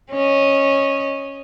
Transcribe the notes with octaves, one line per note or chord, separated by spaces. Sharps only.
C#4 D#5